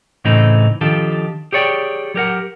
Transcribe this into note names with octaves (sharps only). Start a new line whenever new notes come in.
A2 C#3 E3 A3 C4 D#4
D#3 F3 D4 F4 G4 A4
G4 G#4 C#5 D5 G5
F#3 G4 A#4 F#5